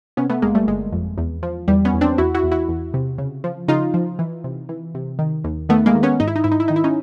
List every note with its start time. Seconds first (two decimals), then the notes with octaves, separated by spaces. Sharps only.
0.17 C3 B3 C#4
0.30 A3 B3
0.42 G1 G#3 A#3
0.55 G3 A3
0.67 G1 G#3
0.92 F2
1.18 E2
1.43 F3
1.68 E2 G3
1.85 B3 C#4
1.94 E2
2.01 C4 D4
2.18 E2 E4 F#4
2.35 E4 F#4
2.44 E2
2.52 E4 F#4
2.69 E2
2.94 C3
3.18 C#3
3.44 F3
3.68 C#3 D#4 F4
3.94 F3
4.19 E3
4.44 C3
4.69 E3
4.95 C3
5.19 D#3
5.44 D#2
5.69 D#3 A3 B3
5.86 G#3 A#3
5.95 D#3
6.03 B3 C#4
6.20 G#2 D#4
6.28 E4
6.36 D#4
6.44 G#2 E4
6.52 D#4
6.60 E4
6.68 D#3 D#4
6.76 E4
6.84 C#4 D#4